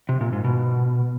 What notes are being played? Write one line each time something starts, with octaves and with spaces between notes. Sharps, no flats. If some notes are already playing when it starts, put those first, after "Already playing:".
C3
A#2
G#2
B2